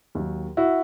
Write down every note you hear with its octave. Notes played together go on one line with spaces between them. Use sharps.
D#2 D#3 F#3
E4 F#4